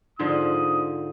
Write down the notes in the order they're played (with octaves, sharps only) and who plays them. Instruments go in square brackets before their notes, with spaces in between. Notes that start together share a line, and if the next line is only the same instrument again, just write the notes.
[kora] G#2 D3 F3 [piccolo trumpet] D#6